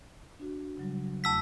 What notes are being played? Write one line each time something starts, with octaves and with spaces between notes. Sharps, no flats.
D4 F#4
C#3 F#3 G3
E2 A3 F#5 A5 E6 B6